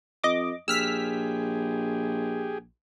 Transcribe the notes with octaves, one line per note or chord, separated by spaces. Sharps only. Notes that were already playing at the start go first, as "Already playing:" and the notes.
F2 D#5 D6
A#1 G4 G#4 E6 F6 B6